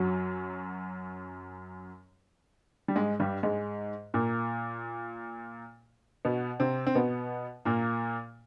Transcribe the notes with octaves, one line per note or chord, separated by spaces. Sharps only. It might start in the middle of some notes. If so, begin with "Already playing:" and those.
Already playing: F#2 F#3
G3
G#2 G#3
G2 G3
G#2 G#3
A#2 A#3
B2 B3
C3 C4
C4
B2 B3
A#2 A#3